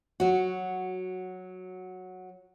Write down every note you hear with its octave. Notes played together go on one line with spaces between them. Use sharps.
F#3 F#4